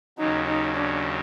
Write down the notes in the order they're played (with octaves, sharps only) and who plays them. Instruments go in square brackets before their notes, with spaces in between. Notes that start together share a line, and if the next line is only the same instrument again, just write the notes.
[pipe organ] D#2 C#3 F#3 [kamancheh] D#4
[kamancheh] D#4
D4